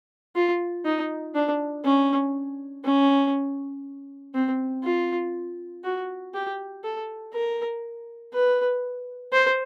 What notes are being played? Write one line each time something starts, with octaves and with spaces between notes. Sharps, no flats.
F4
D#4
D4
C#4
C#4
C4
F4
F#4
G4
A4
A#4
B4
C5